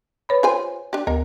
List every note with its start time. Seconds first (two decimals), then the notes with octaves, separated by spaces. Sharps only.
0.29 B4 C#5 B5
0.43 F4 C5 G#5
0.93 D4 G4
1.07 D2 A#4